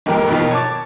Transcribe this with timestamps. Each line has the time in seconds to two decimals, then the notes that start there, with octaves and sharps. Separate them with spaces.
0.06 G#1 F2 A#3 G4 A#4 G5
0.28 B2 D#3 F3
0.51 C#5 A5 D6